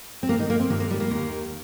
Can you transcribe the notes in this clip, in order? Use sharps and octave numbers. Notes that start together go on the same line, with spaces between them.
C4
G2 D#3 A#3
D#4
A#3
C4
G2 D#3 A#3
A#3
G3
A#3
D#2 D#3